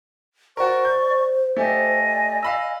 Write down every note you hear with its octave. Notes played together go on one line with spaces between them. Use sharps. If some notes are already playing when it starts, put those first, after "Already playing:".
F#4 A#4 C5 D5 C#6
G6
A3 G4 D5 D#5 G#5
F5 B5 E6